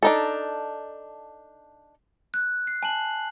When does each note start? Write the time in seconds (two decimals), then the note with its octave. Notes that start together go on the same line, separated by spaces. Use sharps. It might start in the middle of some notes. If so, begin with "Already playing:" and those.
0.03 D4 D#4 A4
2.34 F#6
2.67 C7
2.83 G#5 A5 F#7